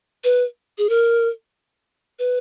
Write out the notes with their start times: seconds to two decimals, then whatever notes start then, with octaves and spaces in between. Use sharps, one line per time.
0.24 B4
0.78 G#4
0.89 A#4
2.19 B4